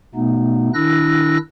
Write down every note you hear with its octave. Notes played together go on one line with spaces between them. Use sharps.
B2 A3 B3 D#4
D#3 D4 E4 E6 F#6 A#6